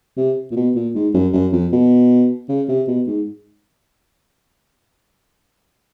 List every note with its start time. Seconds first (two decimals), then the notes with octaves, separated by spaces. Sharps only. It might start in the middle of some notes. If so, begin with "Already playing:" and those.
0.17 C3
0.51 A#2
0.56 B2
0.76 A#2
0.95 G#2
1.14 F#2
1.33 F#2
1.53 F2
1.72 B2
2.49 C#3
2.69 C3
2.88 B2
3.07 G#2